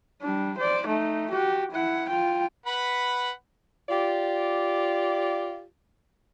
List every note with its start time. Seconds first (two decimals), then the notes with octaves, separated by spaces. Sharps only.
0.22 G3 D4
0.58 C5 D5
0.87 A3 D#4
1.30 F#4 G4
1.71 E4 F#5
2.09 F4 G5
2.66 B4 F#5 B5
3.89 F4 G4 D5